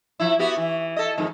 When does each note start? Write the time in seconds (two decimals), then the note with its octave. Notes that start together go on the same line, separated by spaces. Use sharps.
0.20 F3 E4
0.39 B3 F#4 G4
0.57 E3
0.96 A4 D#5
1.18 F2 G#2 D#3